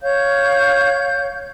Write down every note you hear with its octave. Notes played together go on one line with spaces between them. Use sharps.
C#5 F5 G6